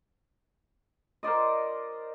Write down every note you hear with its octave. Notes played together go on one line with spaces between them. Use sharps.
A#4 C5 D5 D#5